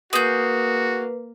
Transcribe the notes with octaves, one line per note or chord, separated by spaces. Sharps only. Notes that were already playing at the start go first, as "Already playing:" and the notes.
A#3 F#4 G#4 B4 G6